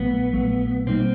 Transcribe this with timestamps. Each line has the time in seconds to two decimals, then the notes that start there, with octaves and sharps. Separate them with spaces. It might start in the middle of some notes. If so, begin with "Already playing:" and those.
Already playing: A#1 A#2 F#3 A3 B3
0.32 A#1 A#2 F#3 A3
0.87 B2 G3 A#3 C4 D#4